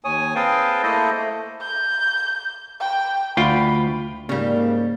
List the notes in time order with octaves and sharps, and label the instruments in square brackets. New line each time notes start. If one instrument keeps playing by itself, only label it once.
[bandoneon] D#2 C#5 G#5 D#6
C4 G#4 B4 F5 G5 A5
A3 A#3 E4 A4 C5 D#5
A3
[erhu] G6
G5
[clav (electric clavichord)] D2 F4 G5 [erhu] B5
[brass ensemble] G#2 A#3 [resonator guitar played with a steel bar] C#3 G3